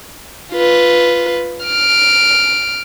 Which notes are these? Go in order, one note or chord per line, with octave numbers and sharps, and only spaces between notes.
F4 B4
F6 D7